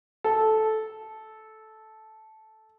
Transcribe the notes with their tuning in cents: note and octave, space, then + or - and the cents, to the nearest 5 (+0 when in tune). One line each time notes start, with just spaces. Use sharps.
A4 -10